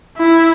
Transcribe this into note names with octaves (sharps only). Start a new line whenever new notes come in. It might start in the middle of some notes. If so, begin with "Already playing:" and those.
E4